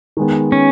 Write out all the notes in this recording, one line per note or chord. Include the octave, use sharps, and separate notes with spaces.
D#3 G#3 B3
C#4